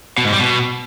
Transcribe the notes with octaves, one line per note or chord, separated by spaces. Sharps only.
B2
G#2
G3
B2